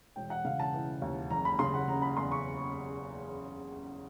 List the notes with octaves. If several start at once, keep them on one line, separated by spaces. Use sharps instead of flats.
E1 G5
F#5
C#3 F5
A5
E3
D#2
F#1 A#5
B5
C#3 C6
F#5
F#1 A#5
B5
E2 C6
C#6